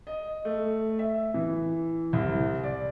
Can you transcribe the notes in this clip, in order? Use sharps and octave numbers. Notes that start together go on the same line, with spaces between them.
D#5
A3
E5
E3
C2
D5